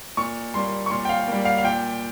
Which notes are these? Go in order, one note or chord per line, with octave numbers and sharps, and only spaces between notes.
A#2 C#6
G3 A#3 C6
C#6
A#2 C6
G5
F5
G3 A#3
F5
F5
A#2 G5